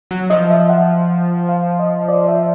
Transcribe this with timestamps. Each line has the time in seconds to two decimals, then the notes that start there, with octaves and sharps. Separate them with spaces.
0.11 F#3
0.30 F3 D#5
0.50 E5
0.70 F#5
1.49 F5
1.79 D#5
2.09 D5
2.28 E5